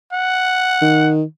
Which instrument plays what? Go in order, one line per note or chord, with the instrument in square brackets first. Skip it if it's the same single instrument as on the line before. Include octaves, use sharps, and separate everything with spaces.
[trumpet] F#5
[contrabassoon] D#3